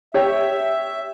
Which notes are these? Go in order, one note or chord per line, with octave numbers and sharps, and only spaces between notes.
G4 C#5 E5